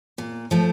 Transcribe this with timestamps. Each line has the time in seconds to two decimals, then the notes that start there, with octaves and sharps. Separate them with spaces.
0.18 A#2
0.51 F3 A3